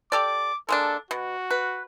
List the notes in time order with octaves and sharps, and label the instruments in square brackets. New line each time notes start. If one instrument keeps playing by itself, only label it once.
[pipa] G4 A4 D5 [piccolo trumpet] D6
[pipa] G#3 A#3 D4 [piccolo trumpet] A4
[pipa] B2 [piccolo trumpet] F#4
[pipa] B4